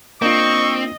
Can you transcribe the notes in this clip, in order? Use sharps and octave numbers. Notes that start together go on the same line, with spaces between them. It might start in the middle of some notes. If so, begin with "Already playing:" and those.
A#3 C4 D4 F4 D#5 C#6